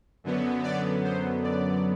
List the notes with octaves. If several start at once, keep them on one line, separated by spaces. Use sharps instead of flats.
F#2 D3 F#3 B3
D5
C5
D5